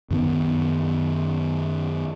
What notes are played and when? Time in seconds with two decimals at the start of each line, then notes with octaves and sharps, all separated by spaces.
0.11 F#2 D#3 B3